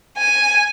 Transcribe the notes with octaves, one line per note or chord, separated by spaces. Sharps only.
G#5